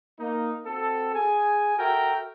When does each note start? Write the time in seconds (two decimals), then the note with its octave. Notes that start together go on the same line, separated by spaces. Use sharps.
0.19 A#3 D#4
0.65 C4 F#4 A4
1.14 G#4 G#5
1.78 F#4 A4 A#4 E5 G5